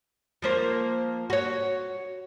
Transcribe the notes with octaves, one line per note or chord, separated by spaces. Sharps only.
F3 A#3 C5
F#4 C#5